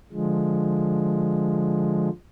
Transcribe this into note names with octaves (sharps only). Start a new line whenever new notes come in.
D3 F3 G#3